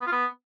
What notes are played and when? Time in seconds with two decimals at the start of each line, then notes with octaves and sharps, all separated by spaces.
0.01 B3
0.07 F4
0.12 B3